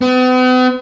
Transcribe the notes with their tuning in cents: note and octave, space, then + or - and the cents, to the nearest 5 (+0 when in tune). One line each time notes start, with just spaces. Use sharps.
B3 +45